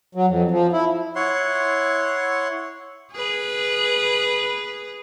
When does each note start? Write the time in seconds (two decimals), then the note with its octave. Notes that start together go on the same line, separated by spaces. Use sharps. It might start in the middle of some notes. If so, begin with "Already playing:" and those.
0.15 F#3
0.27 F2
0.51 F3
0.72 E4
1.15 E4 C#5 F#5 C6
3.13 G#4 B4